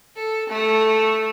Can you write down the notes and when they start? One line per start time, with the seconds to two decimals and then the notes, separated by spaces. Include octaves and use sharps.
0.16 A4
0.49 A3